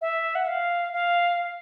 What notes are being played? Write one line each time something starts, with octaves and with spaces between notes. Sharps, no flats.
E5
F#5
F5
F5